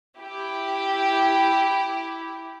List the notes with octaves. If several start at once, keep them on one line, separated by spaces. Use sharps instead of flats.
E4 G4